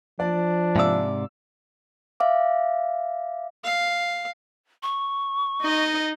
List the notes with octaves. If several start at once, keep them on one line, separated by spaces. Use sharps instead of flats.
F3 D4 D5
G#2 C3 D5 E5 F5 E6
E5 F5 D6
F5
C#6
D#4 D#5